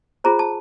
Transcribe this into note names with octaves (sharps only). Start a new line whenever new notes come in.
F4 G#4 C5 A#5
A5